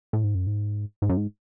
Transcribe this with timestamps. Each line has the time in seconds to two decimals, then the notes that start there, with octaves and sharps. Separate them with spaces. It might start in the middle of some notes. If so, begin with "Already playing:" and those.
0.13 A2
0.24 G#2
0.35 F#2
0.47 G#2
1.02 G#2
1.09 F#2
1.17 G#2